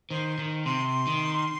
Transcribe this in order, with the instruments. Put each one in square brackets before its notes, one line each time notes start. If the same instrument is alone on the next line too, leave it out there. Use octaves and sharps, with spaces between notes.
[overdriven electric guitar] D#3 [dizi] C5
[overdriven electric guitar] D#3
[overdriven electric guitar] C3 [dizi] C6
[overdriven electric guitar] D#3